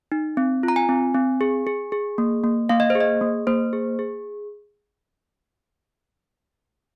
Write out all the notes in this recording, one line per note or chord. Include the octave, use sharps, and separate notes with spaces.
D#4
C4
F4
A#5
G#5
C4
C4
G#4
G#4
G#4
A#3
A#3
A#3 F5
D#5
C5
G#4
D#5
A#3
A#3 C5
G#4
G#4